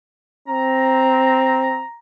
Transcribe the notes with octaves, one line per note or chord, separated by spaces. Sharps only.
C4 A#5